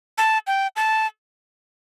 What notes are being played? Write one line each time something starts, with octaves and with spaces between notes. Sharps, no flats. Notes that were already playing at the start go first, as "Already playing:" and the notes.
A5
G5
A5